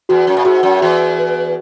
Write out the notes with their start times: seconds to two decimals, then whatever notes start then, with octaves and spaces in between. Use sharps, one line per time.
0.09 E2 F#4
0.27 F#2
0.37 A#2
0.45 G#2 F#4
0.63 F#2
0.81 E2 F#4
1.19 B4